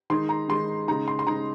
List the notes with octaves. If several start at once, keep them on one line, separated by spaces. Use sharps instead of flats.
D#3 G#3 D#4 C6
A#5
D#3 G#3 D#4 C6
C#3 G#3 D#4 A#5
C6
C6
C#3 G#3 D#4 A#5